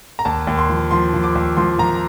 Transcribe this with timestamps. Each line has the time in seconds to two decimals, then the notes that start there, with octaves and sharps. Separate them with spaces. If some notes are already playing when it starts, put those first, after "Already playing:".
0.19 A#5
0.25 D#2 A5
0.47 D#2
0.58 C6
0.70 F3
0.91 F3 C6
1.14 F3
1.24 D6
1.35 D#2
1.57 F3 C6
1.78 F3 A#5